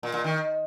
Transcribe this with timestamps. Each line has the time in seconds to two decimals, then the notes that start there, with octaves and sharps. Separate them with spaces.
0.03 A#2
0.14 A#2
0.24 D#3